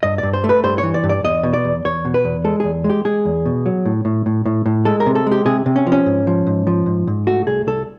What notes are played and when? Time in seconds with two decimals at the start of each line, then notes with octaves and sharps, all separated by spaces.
0.03 G2 D#5
0.18 G2 D5
0.33 C5
0.44 A3
0.49 B4
0.64 G2 C5
0.78 C#5
0.83 E3
0.94 D5
1.04 G2
1.09 D5
1.24 E2 D#5
1.43 B2
1.53 D5
1.65 E2
1.85 E2 C#5
2.05 B2
2.14 B4
2.24 E2
2.44 G#3 A4
2.60 E2 G#4
2.84 G#3
2.90 G4
3.05 G#3 G#4
3.25 E2
3.46 B2
3.66 F#3
3.86 A2
4.05 A2
4.26 A2
4.46 A2
4.66 A2
4.85 G#3 A4
5.00 A#4
5.06 C3
5.15 A4
5.27 G#3 G4
5.46 C3 G#4
5.66 C3
5.76 C#4
5.87 F3
5.92 C#4
6.06 G#2
6.27 F3
6.47 G#2
6.67 F3
6.86 G#2
7.07 G#2
7.27 A3 F#4
7.47 C2 G#4
7.67 C2 A4